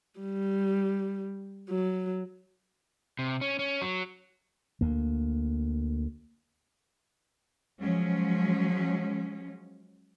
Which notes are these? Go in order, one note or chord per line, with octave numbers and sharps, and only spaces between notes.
G3
F#3
C3
C#4
C#4
F#3
D2 A#3
F3 F#3 G#3 C#4